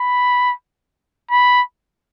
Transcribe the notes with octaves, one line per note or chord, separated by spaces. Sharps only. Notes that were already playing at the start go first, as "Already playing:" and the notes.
Already playing: B5
B5